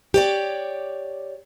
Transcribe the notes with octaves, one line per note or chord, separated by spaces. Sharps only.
G4 C#5 D5